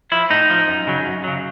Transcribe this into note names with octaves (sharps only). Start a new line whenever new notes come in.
F3 E4
A2 D#4
F3
F#2
C#3 F#3
F#2
C#3 F#3